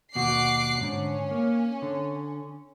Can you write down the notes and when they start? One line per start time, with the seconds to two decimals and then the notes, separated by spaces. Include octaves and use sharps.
0.15 D#2 B2 F#4 D6 F#6 C7
0.80 G#2 D3 C#4
1.31 A#3
1.82 D3